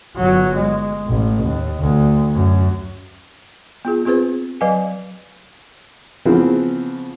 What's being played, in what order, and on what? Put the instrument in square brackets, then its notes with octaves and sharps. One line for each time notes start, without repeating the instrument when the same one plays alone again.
[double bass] G1 F#3
G#3
A1
D#2
D2
F#2
[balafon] B3 F4 G#4
C4 F4 G#4 B4 C5
F#3 B4 D#5 F5 G#5
[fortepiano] C#3 E3 F3 B3 C4